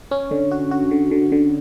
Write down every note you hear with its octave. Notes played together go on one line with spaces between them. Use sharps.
C#4
D3
F#4
F#4
D3
D3
D3